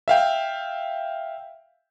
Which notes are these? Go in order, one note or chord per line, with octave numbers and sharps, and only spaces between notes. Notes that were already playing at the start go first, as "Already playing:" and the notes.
E5 F5 G5